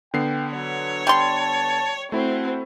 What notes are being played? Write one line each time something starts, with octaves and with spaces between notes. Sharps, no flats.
D3 B3 G5 C7
F#3 C#5
G3 A5 C6
A5
A3 C4 E4 F#4